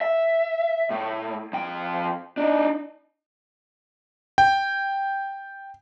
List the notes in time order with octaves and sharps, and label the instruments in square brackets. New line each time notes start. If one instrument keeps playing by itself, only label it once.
[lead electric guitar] E5
A2
F2 G5
D4 D#4
[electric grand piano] G5